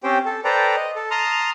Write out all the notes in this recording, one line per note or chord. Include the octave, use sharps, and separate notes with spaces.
C4 C#4 G4 C5 G5
A4
A4 B4 C5 D5 G5 A#5
D#5
A4
A5 A#5 C6 D#6 F6